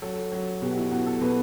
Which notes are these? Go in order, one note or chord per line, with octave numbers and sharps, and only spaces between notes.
F#3 A4
F#3
B2 G4
F#4
E4
B2 F#4
A4
B2 B4